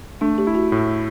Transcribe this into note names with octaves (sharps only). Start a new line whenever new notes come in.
A3 D4
G4
E4
F#4
A2